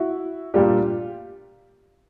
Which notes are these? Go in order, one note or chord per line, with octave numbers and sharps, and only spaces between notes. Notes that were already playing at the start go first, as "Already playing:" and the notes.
Already playing: E4 F#4
A#2 G3 A#3 D4 F4 G4